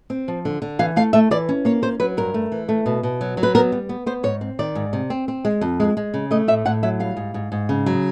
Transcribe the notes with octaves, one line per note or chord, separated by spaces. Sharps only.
C4
F3
D3
D3
E3 F5
A3 F5
A3 E5
E3 D5
C#4
A#3 C#5
C#4 C5
F#3 B4
G2 A#4
A3
E3
A3
B2
B2
F#3
F#3
B4
B3 A#4
G3
B3
B3 C5
G#2 C#5
C4
D#3 D5
G#2
C3
C4
C4
G#3
F2
G#3
G#3
C#3
A3 D#5
A2 E5
A2 F#5
F#3 E5
G3 F5
G#2
G#2
G#2
C#3
F#3